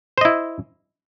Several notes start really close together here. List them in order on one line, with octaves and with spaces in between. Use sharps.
C5 D#5 E4